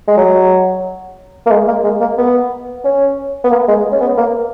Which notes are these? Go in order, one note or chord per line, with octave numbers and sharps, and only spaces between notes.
G#3
F#3
A#3
G#3
A#3
G#3
A#3
B3
C#4
B3
A#3
G#3
C#4
B3
A#3